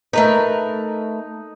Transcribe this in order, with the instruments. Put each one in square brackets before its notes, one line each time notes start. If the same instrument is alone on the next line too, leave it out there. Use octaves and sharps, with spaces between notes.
[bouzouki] A3 A#4 B4 [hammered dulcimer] D#4 A#5